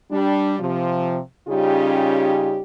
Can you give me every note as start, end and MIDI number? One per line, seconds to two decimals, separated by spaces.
0.11 0.55 55
0.11 0.55 62
0.60 1.18 48
0.60 1.18 53
1.48 2.62 49
1.48 2.62 55
1.48 2.62 61
1.48 2.62 63
1.48 2.62 65
1.48 2.62 67